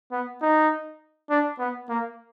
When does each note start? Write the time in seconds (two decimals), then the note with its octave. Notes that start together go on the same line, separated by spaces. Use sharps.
0.12 B3
0.42 D#4
1.30 D4
1.59 B3
1.89 A#3